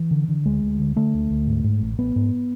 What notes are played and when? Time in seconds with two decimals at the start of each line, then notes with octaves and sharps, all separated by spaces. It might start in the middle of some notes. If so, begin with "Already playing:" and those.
Already playing: E3
0.11 D3
0.28 D3
0.46 D2 G#3
0.63 D2
0.79 D3
0.96 D3 A3
1.14 D2
1.30 D2
1.47 G#2
1.64 G#2
1.81 A1
1.98 A1 B3
2.16 G#2